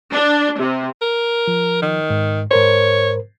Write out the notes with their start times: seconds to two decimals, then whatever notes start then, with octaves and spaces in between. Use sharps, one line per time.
0.13 D4
0.59 C3
1.02 A#4
1.48 F3
1.82 D#3
2.10 G#2
2.51 G#2 A#4 C5 C#5